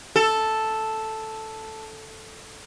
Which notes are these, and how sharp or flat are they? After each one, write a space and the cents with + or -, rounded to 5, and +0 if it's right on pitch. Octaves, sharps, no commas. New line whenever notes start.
A4 +0